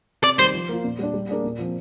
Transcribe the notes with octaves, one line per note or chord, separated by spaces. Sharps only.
C3 D5
D#3 G3 C5
F3
A#3 F4
A#2
G3 D4
G3
A#3 D4 G#4
A#2
F3 C4